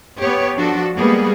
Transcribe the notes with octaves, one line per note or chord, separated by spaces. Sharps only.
B3 G4 C#5
F3 D4 F#4 A4
G3 G#3 A#3 B3 G#4